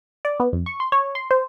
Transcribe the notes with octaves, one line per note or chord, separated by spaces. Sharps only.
D5
B3
F2
C#6
C6
C#5
C6
C5